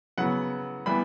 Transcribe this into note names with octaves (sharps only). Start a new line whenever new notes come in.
C#3 F#3 B3 F#5
E3 G3 B3 B5